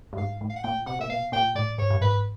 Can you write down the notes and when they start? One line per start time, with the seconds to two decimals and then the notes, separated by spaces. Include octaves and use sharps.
0.13 G2
0.18 G#2 F5
0.41 A2
0.50 F5
0.56 F#5
0.64 A#2 G5
0.86 C3 F#5
0.99 A#2 E5
1.09 B2 F5
1.32 A#2 G5
1.55 A2 D5
1.78 G#2 C#5
1.90 G2
2.01 G#2 B4